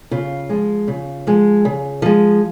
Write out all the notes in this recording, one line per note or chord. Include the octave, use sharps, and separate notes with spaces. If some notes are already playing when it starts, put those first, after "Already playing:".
C#3 F4
F3 G#3
C#3
F3 G#3
C#3
F3 G#3